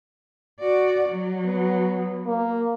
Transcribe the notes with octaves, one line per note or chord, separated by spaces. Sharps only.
F#4 D5
F#3
B3
A#3